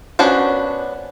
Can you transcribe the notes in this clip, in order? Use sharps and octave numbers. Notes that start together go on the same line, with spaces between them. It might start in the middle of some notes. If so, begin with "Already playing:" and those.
B3 C#4 D4 F#4 C5